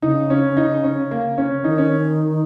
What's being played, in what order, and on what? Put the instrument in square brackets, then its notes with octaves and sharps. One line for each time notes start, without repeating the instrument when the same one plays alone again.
[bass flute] C#3 [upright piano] D#4
[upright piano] C#4
D#4
C#4
A#3
C#4
[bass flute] D#3 [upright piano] D#4
[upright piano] C#4